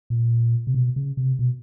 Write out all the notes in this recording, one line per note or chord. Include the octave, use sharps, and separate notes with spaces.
A#2
C3
B2
C#3
C3
B2